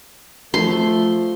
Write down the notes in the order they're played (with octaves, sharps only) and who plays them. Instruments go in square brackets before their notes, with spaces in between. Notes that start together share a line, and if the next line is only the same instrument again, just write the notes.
[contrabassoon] F3 [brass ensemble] A3 [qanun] C6